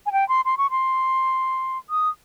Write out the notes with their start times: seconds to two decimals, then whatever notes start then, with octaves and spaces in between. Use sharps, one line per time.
0.06 G#5
0.12 G5
0.29 C6
0.45 C6
0.58 C#6
0.71 C6
1.90 D#6